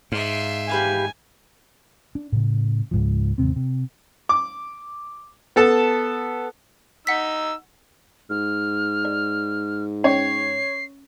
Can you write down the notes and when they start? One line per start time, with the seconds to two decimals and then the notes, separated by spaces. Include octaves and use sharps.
0.12 G#2 E5 F5 C6
0.69 G4 B4 F5 G#5
2.15 D4
2.32 A2 C#3
2.91 C#2 G#2 F3
3.38 D#2 G#2 C3 C4
3.56 C3
4.29 D6
5.56 B3 A4 A5
7.07 D#4 F#5 E6 B6
8.30 G#2 F6
9.05 D5
10.04 C#4 C#5 C7